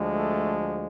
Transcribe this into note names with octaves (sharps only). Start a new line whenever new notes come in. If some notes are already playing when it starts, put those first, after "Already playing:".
Already playing: D2 D3 F3 G#3
A3